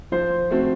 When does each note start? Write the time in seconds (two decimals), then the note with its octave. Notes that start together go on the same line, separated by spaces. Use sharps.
0.12 F3 C5
0.51 A3 C4 F#4 A4